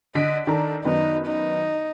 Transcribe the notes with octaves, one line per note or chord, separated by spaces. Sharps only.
D3 D#5 B6 D7
D#3 D4 A4 A#5
F#2 D#3 B3 D#4
D#4